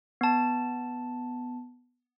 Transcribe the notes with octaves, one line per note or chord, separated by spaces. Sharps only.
B3 A5